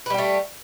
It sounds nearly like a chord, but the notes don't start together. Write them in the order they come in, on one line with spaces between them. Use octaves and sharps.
B4 G3 G4 A3